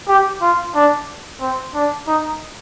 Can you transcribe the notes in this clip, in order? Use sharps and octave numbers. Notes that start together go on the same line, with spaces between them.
G4
F4
D4
C4
D4
D#4